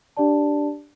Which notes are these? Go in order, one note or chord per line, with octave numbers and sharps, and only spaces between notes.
D4 G4 D5 A5